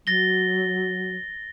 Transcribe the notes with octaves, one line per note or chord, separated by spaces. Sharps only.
F#3 A6 A#6 G7